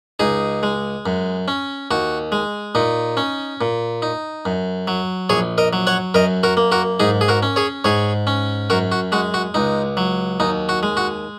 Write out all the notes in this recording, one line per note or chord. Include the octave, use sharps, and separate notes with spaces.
C#2 D#4 G#4
G#3
F#2
C#4
D#2 F#4
G#3
A#2 D#4
C#4
A#2
D#4
F#2
F#3
A#1 G#4 C#5
A#4 D#5
F#3
C#5 F#5
F#2 A#4 D#5
F#4 A#4
A#3
F#4 A#4
G#2 D#4 G#4
G#4
F#4 A#4
C#4
G#4 C#5
G#2 G#4 C#5
C#4
F#2 F#4 A#4
F#4
G#3 F#4
F#4
C#2 D#4
F#3
D#2 D#4
F#4
G#3
F#4